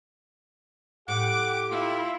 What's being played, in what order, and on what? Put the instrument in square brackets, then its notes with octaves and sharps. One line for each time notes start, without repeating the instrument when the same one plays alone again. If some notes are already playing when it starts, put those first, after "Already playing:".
[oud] A2 [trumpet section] G4 [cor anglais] F#5 [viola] D6
[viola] E4 [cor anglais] F4